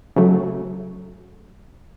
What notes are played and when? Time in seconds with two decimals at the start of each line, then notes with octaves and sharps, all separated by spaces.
0.16 C#3 F#3 A3